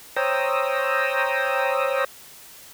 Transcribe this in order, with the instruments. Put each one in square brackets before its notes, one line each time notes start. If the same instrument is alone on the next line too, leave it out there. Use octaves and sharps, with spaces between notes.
[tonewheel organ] C5 C#5 G5 A#5 D#6 E6